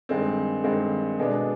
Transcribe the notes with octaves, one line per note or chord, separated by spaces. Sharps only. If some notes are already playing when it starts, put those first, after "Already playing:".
G2 D#3 G#3 C4
G2 D#3 G#3 C4
B2 G#3 B3 D4